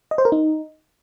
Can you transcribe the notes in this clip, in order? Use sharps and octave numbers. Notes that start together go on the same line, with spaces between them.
D#5
C5
A#4
D#4